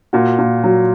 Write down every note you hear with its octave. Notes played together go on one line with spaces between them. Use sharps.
A#2 F#4
A#2
F#3